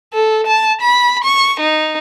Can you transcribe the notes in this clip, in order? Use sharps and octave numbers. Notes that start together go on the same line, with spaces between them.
A4
A5
B5
C#6
D#4